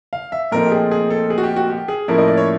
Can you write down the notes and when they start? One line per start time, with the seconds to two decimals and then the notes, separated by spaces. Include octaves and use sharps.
0.13 F5
0.32 E5
0.52 A#2 F3 A3 C4 D#4 A#4
0.66 G4
0.72 G#4
0.91 G#4
1.10 A4
1.30 G#4
1.38 F#4
1.43 G4
1.56 F#4
1.70 G4
1.88 G#4
2.08 A2 F3 A#3 C#4 E4 A#4
2.18 D#5
2.28 D5
2.37 C#5